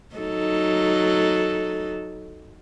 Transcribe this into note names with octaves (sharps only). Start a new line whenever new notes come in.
F#3 D#4 A4